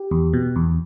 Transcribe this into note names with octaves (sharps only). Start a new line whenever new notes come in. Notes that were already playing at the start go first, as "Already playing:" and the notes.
Already playing: G4
E2
B2
E2